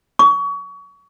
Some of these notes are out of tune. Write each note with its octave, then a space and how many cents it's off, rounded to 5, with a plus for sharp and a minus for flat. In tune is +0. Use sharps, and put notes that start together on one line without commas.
C#6 +30